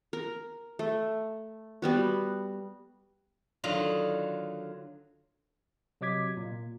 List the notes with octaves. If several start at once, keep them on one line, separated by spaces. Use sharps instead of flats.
A#4
A3
G3 B3 F#4
D3 D#3 F#3 F4 D#5
C3 F#3 D#5 D6 G#6 B6
A#2